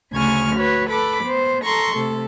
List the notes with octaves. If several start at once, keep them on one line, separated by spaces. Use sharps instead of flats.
D2 C#3 G#5 C#6 F6
F#4 B4 C#5
A4 B4 B5 D6
B3 C5
A4 A#5 C6 C#6
C3 A3 A4